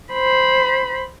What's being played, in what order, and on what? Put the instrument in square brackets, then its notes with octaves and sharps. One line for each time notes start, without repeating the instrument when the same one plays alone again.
[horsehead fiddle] C5 B5